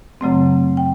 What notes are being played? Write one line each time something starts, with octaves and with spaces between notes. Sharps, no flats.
F#2 C#3 F#3 A3 C4
G5